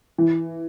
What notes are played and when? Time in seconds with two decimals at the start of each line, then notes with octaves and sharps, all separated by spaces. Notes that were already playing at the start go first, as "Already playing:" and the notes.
0.18 E3